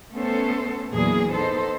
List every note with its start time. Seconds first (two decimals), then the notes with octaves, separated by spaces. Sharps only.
0.11 A3 B3 C#4 A4 C5
0.92 E2 A#2 F#3 A#3 D4 G#4
1.30 B3 D#4 A4 C5